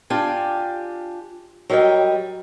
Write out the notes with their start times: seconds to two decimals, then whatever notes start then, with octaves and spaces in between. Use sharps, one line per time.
0.10 D4 F4 G4 G5 G#5
1.70 F#3 G3 A#4 D#5 G5